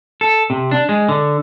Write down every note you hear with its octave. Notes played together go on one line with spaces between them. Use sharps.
A4
C3
D4
G#3
D3